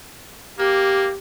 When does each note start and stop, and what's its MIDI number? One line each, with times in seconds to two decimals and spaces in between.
0.58 1.09 58
0.58 1.18 67